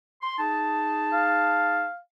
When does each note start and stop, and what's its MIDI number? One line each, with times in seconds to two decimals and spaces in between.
0.22 0.36 84
0.38 1.85 63
0.38 1.85 68
0.38 1.85 81
1.13 1.98 77